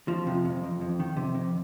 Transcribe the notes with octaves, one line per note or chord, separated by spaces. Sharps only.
F2 F3
C3
F2
F2
F2
D#3
C3
F2